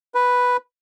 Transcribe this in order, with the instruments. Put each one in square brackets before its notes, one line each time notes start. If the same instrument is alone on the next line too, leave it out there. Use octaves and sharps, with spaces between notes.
[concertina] B4